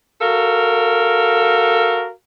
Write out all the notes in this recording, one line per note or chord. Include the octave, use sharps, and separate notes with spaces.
F#4 A4 A#4 F5